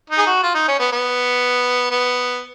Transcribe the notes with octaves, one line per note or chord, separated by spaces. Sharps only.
D#4
G#4
F#4
F4
D#4
C#4
B3
B3
B3